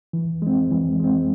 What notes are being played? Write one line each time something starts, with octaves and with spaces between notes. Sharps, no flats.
E3
G#3 C4
E3
G#3 C4